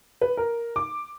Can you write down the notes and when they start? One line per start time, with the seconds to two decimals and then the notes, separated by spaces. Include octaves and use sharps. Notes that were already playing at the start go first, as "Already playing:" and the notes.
0.21 B4
0.37 A#4
0.76 D6